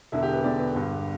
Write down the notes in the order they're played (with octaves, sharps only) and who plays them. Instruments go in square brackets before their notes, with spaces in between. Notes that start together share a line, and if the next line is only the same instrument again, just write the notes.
[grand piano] E1 E2 D3 E4
G4
B4
E1 E2 D3 D5
B4
G1 G2 D3